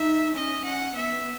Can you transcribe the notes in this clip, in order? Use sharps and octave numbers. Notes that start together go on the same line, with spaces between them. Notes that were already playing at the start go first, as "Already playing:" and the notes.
Already playing: D#4 E5
C#4 D#5
C#4 F#5
B3 E5